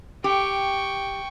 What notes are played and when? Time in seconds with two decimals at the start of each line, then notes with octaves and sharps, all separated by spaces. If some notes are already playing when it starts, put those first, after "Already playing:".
0.24 G4 G5 C#6